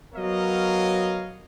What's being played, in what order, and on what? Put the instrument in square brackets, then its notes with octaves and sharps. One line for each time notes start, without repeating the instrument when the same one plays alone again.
[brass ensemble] F#3 B3 A#4 C#5 D#5 F5